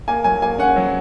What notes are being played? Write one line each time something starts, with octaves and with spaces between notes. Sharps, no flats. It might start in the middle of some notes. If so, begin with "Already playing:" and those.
A#3 G#5
F#3 G#5
A#3 G#5
C#4 F#5
F#3